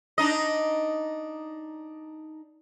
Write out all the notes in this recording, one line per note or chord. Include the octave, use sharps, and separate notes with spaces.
D4 D#4 D#5